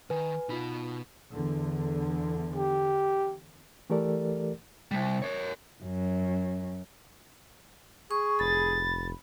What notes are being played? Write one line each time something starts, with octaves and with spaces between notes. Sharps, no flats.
D#3 B4 G#5
B2 D#4 F4 B5
E2 D3
G4
E3 A3 G4 A4 A#4 D5
C3 G3
A#4 C#5
F#2
G#4 C#6
F1 B5 A6